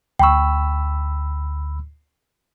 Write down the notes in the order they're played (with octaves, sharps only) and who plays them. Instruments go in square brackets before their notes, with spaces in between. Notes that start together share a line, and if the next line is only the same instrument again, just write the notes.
[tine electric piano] D2 B5 E6 [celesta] G5 C#6